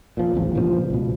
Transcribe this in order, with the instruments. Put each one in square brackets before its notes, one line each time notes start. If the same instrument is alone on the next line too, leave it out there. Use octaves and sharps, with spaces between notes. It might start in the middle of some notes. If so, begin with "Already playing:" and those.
[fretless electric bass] A#2 F3
D1 G#1 E2
G2 A#2 C#3 F3
C#2 B2